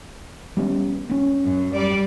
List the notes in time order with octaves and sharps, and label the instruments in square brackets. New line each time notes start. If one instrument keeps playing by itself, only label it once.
[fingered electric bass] G3 B3 C#4
B3 C#4
[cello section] F#2
G3 D5